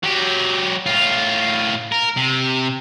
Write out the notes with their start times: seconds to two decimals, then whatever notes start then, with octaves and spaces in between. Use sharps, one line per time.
0.03 F#3 G4
0.86 A2 F4
1.92 A#4
2.17 C3